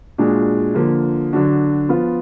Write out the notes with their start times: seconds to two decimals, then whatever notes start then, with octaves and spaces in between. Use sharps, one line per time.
0.18 A#2 G#3 D4 F#4
0.75 D3 F3 A#3
1.33 D3 F#3 D4 F#4
1.89 F3 B3 F4